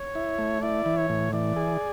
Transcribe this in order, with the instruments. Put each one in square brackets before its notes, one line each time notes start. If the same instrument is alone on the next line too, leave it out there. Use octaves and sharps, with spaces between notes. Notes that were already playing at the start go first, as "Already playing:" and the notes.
Already playing: [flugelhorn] C#5
[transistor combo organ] E4
A3
[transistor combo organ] E4 [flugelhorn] D5
[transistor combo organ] E3
[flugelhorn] C#5
[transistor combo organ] A2
[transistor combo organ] E3 [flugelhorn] D5
[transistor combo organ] G#4